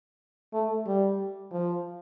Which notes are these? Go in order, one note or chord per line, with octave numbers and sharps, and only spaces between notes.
A3
G3
F3